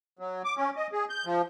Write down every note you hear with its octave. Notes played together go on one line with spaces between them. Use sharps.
F#3
D6
C#4
D#5
G#4
G6
F3